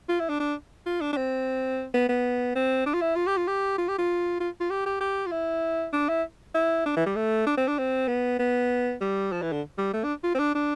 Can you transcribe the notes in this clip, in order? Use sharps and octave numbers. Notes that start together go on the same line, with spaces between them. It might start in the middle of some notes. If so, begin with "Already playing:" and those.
F4
E4
D4
D4
F4
D4
D4
C4
B3
B3
C4
D4
F4
E4
F4
G4
F4
G4
F4
G4
F4
F4
F4
G4
G4
G4
F4
E4
D4
E4
E4
D4
E3
G3
A3
D4
C4
D4
C4
B3
B3
G3
F3
E3
D3
G3
A3
D4
F4
C4
D4
D4